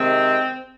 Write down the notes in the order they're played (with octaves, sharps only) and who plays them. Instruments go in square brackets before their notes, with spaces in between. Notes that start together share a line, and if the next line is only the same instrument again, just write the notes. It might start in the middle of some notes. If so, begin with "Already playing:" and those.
Already playing: [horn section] C3 D#3 G#3 C4